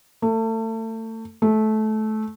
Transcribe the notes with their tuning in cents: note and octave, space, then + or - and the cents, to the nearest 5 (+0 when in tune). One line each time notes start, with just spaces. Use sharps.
A3 +30
A3 -20